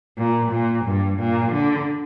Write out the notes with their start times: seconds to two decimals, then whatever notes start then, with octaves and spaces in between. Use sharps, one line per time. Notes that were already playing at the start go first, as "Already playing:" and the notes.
0.18 A#2
0.52 A#2
0.85 G2
1.19 A#2
1.52 D3